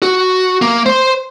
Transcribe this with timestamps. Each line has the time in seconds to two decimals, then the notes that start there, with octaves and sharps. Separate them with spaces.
0.02 F#4
0.62 A#3
0.86 C5 C6